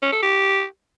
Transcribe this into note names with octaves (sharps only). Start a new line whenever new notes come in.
C#4
A4
G4